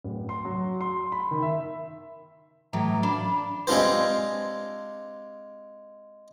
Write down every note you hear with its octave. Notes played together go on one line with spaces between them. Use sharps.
D1
C6
F#3
C6
B5
D#3
E5
A2 E3 F#3 A#5
D4 F5 B5
G#3 C4 D4 F4 G4 C5